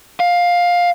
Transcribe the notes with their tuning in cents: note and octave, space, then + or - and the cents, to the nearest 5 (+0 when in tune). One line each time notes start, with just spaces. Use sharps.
F5 +15